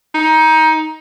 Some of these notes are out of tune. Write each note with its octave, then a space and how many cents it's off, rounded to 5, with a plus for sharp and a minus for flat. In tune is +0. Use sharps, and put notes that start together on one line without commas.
D#4 +20